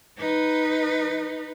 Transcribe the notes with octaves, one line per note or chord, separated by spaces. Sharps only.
D#4 B4